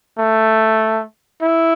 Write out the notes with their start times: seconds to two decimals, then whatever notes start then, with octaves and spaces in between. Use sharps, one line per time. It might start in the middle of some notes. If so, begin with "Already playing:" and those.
0.18 A3
1.41 E4